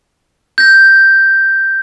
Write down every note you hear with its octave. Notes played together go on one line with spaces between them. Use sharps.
G6 A#6